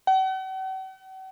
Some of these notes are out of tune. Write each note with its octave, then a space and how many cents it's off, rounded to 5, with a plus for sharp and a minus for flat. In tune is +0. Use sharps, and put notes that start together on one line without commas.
F#5 +45